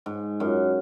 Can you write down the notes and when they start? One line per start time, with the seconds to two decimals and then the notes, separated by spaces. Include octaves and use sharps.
0.06 G#2
0.40 F#2